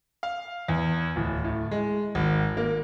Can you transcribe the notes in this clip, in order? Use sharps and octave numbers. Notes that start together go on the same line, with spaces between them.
F5
E2
D1
A2
G#3
G#1
A#3